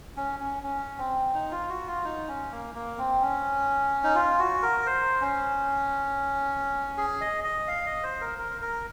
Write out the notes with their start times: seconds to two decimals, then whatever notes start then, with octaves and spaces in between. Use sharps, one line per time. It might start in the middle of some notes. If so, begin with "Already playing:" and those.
0.17 C#4
0.40 C#4
0.63 C#4
0.98 C4
1.34 D#4
1.51 F4
1.69 F#4
1.87 F4
2.04 D#4
2.28 C#4
2.51 A#3
2.75 A#3
2.98 C4
3.22 C#4
4.04 D#4
4.15 F4
4.39 F#4
4.63 A#4
4.86 C5
5.21 C#4
6.98 G#4
7.21 D#5
7.44 D#5
7.68 F5
7.86 D#5
8.03 C5
8.21 A#4
8.38 A#4
8.62 A#4